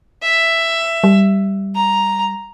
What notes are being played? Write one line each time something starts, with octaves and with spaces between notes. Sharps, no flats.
E5
G3
A#5